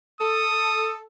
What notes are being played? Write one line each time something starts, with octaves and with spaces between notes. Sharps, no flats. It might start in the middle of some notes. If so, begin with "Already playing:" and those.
A4 D#6